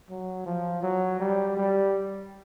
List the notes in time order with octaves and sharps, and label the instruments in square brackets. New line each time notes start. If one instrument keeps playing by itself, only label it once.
[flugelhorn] F#3
F3
F#3
G3
G3